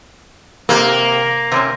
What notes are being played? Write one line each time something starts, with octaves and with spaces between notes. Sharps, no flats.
C3 A#3 G4
C3 C4 C#4